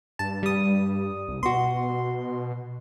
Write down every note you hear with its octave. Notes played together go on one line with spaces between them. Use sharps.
G2 A5
G3 D#6
C2
B2 F#4 C6